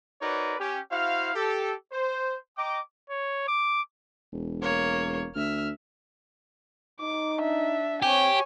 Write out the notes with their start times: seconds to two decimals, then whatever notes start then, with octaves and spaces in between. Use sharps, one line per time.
0.22 D#4 F#4 A#4 B4 C#5 D5
0.60 C#4 G4
0.91 E4 F#4 C5 F5
1.35 G4 A4
1.92 C5
2.57 D#5 G5 A#5 D6
3.10 C#5
3.48 D6
4.32 E1
4.62 A#3 C#5
5.35 D2 E5 F6
7.01 D#4 D6
7.38 D4 E5
8.02 C4 G4 C#5 G#5